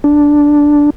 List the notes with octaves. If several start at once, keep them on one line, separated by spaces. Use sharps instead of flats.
D4